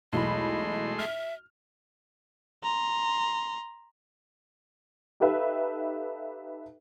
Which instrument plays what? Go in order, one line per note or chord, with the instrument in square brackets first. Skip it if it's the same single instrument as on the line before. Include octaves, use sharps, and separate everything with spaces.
[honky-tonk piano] B1 E2 B5 [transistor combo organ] G#3 A3 C6 [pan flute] D#5
[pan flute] E5 [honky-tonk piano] F6
[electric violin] A#5 C6
[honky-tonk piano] D#4 G4 A4 B4 E5 F5